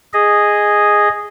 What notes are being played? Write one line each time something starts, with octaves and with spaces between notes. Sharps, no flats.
G#4 D#5